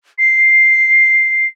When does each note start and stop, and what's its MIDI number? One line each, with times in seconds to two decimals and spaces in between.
0.18 1.46 96